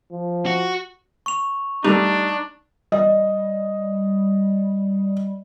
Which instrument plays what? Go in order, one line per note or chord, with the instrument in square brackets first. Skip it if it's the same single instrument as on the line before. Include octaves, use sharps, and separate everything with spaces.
[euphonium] F3
[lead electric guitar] F#4
[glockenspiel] C#6 F7
[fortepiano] G3 A3 [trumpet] D4 [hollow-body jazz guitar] D#4
[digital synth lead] G3 [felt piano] D#5